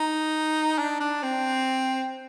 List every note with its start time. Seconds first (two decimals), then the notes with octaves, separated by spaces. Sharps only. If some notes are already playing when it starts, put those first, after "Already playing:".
Already playing: D#4
0.79 D4
1.00 D4
1.23 C4